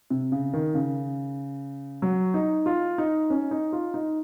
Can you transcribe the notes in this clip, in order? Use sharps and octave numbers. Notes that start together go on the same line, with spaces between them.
C3
C#3
D#3
C#3
F#3
D#4
F4
D#4
C#4
D#4
F4
D#4